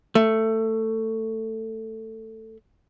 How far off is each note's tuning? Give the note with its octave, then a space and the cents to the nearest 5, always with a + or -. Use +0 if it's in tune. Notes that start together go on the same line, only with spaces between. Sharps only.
A3 +15